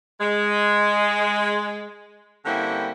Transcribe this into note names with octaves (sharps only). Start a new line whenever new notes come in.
G#3
D3 G3 A#3 C4 C#4 E4